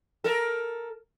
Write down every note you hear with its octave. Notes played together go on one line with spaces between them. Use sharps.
A4 A#4